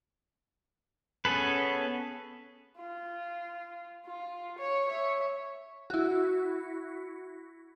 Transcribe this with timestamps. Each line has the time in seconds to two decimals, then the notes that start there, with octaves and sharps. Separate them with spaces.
1.25 B3 C#4 G#4 A4 B4
2.77 F4
4.06 F4
4.58 C#5
4.88 C#5 E5
5.90 E4 F#4